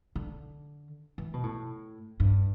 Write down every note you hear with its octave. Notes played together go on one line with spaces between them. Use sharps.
D3
E3
B2
A2
G2